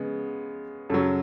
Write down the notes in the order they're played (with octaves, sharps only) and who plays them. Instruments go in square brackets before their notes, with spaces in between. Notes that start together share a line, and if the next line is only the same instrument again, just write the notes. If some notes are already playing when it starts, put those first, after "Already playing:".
Already playing: [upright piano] C#3 G#3 B3
F#2 C#3 F#3 A4